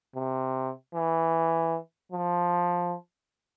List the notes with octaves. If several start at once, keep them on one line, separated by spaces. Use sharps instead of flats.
C3
E3
F3